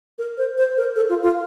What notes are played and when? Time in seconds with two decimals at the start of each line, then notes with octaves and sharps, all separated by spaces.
0.18 A#4
0.38 C5
0.58 C5
0.77 A#4
0.96 A4
1.09 F4
1.23 F4